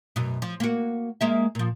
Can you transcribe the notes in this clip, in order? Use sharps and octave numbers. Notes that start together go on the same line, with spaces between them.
F#2 B2
F3
A#3 F#4
G#3 A#3 E5
A#2 F3